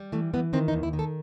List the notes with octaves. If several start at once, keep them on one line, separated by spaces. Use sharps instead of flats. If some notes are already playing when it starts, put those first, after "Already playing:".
Already playing: G3
E3 A3
E3 B3
D#3 C4
D#4
D#2
E4
D#3
A4